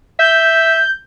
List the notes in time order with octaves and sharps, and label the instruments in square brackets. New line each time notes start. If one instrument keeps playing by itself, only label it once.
[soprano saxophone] E5 [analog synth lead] G6